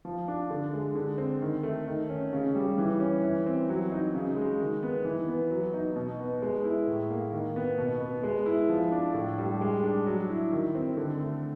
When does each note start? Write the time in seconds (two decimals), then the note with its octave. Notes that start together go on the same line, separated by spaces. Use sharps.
0.05 F3
0.28 D4
0.50 D3
0.73 G#3
0.95 D3
1.18 C4
1.42 D#3
1.63 A3
1.87 D#3
2.09 C#4
2.33 C#3
2.55 G3
2.78 E3
3.00 C#4
3.23 E3
3.46 C4
3.69 F#3
3.92 D#4
4.15 C#3
4.36 G#3
4.60 D#3
4.83 B3
5.05 E3
5.28 B3
5.50 F#3
5.74 D#4
5.96 B2
6.19 B3
6.42 G#3
6.64 E4
6.88 A2
7.10 A#3
7.32 D#3
7.56 B3
7.78 B2
8.00 B3
8.23 G#3
8.46 E4
8.69 F3
8.92 D4
9.14 A2
9.38 G3
9.61 G#3
9.83 D4
10.06 F#3
10.29 E4
10.52 D#3
10.75 C4
10.97 D3
11.19 A3